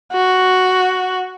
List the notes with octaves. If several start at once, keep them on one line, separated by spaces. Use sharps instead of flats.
F#4